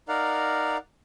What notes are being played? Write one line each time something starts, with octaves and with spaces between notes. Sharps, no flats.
D#4 A#4 D5 F5 F#5